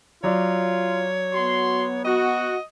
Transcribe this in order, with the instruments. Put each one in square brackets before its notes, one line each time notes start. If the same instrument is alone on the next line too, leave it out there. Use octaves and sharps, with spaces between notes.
[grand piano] F#3 D5 [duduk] F4 [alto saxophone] C#5
[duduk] B3 [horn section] F#4 C6
[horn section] F#4 [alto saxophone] D#5